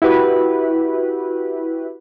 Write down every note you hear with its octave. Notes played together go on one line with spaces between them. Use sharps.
E4 F#4 G4 B4